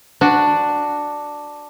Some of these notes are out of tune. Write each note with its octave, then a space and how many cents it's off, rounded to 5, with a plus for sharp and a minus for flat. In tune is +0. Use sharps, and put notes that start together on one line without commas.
D4 +5 F#4 +0